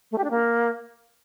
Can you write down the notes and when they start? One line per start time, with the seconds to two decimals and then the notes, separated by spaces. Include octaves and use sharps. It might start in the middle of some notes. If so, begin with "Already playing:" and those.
0.12 A3
0.18 G4
0.24 D4
0.31 A#3